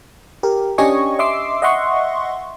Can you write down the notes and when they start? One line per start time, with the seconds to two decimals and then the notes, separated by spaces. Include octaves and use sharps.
0.43 G4 A#4
0.78 C#4 D4 G4 D#5 G#5 C#6
1.19 D#5 E5 C6 D6 E6 C7
1.62 D#5 E5 F#5 C6 C#6